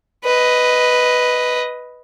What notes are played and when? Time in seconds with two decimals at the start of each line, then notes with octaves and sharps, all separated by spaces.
0.24 B4 D#5